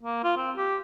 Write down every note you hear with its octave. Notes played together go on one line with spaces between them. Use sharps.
A#3
F4
C4
G4